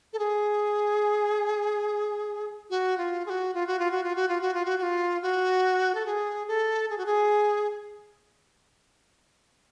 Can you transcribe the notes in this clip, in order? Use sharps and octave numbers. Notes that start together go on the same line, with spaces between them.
A4
G#4
F#4
F4
G#4
F#4
F4
F#4
F4
F#4
F4
F#4
F4
F#4
F4
F#4
F#4
F4
F#4
A4
G#4
A4
G#4
F#4
G#4